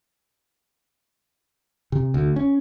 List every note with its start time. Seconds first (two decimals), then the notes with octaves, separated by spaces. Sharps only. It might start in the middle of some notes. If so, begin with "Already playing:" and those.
1.92 C3
2.14 D2
2.36 C#4